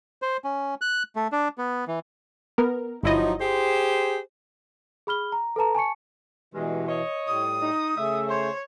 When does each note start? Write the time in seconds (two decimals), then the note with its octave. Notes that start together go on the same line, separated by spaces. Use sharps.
0.22 C5
0.44 C#4
0.81 F#6
1.16 A3
1.32 D4
1.58 B3
1.88 E3
2.58 B3 A#4
3.03 G1 F3 F#3 D#4 E4 D#5
3.40 G4 G#4 C5
5.07 G#4 B5 F6 G7
5.32 A#5
5.56 A4 B4 A5 A#5
5.75 G#5 A5 C#6 C#7
6.54 G2 B2 E3 G#3
6.87 C#5 D#5
7.27 A2 G3 D#6
7.62 D#4
7.96 C#3 A3 E5
8.29 C5 C#5